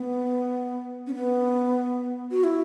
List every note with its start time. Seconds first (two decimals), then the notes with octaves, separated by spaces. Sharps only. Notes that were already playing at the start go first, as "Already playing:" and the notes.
Already playing: B3
1.07 C#4
1.15 B3
2.31 F#4
2.44 E4